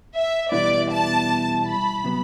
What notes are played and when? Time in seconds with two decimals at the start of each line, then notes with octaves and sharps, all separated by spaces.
0.13 E5
0.51 E2 B2 G3 B3 E4 D5
0.90 A5
1.66 B5
2.04 C3 F#3 B3